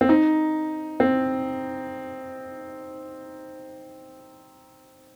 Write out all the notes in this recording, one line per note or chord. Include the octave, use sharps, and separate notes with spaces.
C4
D#4
C4